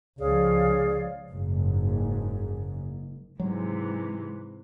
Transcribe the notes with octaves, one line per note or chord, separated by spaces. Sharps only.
C#2 F3 G#4 C#5 D5 F5
F#1 G#2
G#2 C3 E3 F#3